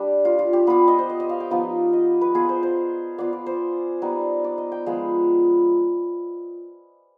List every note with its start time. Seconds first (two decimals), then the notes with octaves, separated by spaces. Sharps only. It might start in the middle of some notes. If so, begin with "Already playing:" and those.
Already playing: G3 D4 G4
0.25 F4
0.39 F4
0.53 G4
0.67 B3 F4 B4
0.88 D#5
0.99 C5
1.09 D#5
1.20 D#5
1.29 F5
1.40 G5
1.50 F3 B3 D#4 F5
1.93 D#5
2.21 B4
2.34 B3 F4 G#4
2.49 C5
2.63 C5
3.18 B3 F4 D5
3.33 D5
3.46 C5
4.02 G3 B3 D#4
4.44 D5
4.58 D#5
4.72 G5
4.86 F3 G#3 B3